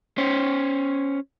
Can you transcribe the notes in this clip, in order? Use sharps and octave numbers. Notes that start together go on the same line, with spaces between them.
C#4 C5